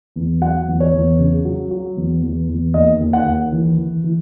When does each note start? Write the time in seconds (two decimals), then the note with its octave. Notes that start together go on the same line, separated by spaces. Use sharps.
0.16 E2
0.41 F#3 F#5
0.68 E2
0.80 C#5
0.93 E2
1.19 C#3
1.45 F#3
1.71 F#3
1.97 E2
2.22 E2
2.49 E2
2.74 D#2 D#5
3.00 D#2
3.13 F#5
3.26 D#2
3.52 E3
3.78 E3
4.04 E3